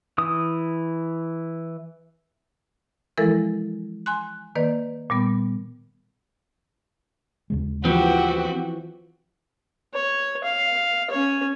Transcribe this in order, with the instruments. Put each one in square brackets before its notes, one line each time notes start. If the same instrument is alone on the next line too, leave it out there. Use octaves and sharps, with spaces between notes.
[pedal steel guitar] E3 D#6
[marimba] E3 F3 G#3 E4 A4 A#4
G#5 C6 F#6
D#3 A#3 B4 D5
A#2 G3 B3
[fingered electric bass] D#2 C#3 G#3
[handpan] E3 F3 [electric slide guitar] B3 C4 [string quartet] F#4 G4
[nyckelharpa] C#5
F5
C#4 C#5